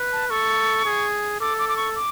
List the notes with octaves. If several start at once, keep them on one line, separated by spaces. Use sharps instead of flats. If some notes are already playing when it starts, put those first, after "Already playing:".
Already playing: B4
A5
A4 C#6
G#4
A4 D6
D6
D6
C#6
D6